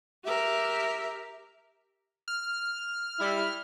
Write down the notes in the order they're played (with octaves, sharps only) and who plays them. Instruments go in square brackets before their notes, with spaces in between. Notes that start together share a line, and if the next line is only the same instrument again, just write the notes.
[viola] G4 A#4 [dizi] E5
[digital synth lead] F6
[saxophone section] G3 E4